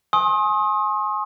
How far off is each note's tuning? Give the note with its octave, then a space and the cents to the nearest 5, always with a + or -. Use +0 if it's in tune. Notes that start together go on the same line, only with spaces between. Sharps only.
G#5 +20 C6 +40 D#6 +20